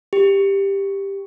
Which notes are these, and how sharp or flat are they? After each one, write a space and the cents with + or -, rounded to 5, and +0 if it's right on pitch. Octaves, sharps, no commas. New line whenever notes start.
G4 +10